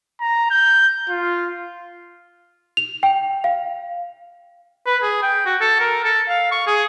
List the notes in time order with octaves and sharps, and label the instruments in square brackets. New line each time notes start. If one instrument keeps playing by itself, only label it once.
[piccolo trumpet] A#5
G6
F4
[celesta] F7
G5
F5
[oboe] B4
G#4
G5
F#4
A4
A#4
A4
F5
C#6
G#4